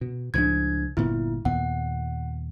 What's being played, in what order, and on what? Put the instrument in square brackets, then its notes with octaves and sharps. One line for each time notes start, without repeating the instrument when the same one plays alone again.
[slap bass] B2
[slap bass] C#2 A2 F3 [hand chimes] D4 G#6
[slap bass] G1 A#2 B3 [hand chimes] E4
[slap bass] D#2 A#2 B3 [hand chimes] F#5